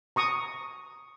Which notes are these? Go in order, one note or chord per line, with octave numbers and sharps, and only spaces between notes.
A#5 C#6 D#6